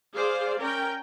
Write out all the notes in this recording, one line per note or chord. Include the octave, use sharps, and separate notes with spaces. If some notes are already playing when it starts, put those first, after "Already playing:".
G#4 C5 D5 F5
C#4 A#4 G5